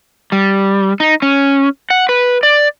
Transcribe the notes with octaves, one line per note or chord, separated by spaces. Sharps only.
G3
D#4
C#4
F#5
B4
D5